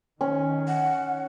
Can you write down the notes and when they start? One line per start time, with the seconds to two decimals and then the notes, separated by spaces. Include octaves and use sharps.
0.21 D#3 C#4
0.68 F#5